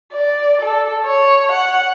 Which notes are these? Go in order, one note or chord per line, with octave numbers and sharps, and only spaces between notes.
D5
A4
C#5
F#5